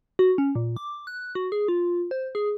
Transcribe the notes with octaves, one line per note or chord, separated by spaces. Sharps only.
F#4
C#4
A#2
D6
F#6
F#4
G#4
F4
C5
G#4